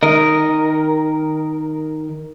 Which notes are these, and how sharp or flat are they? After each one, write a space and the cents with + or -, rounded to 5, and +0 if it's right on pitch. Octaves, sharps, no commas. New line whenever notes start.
D#3 +0 A#4 +0 D#5 +0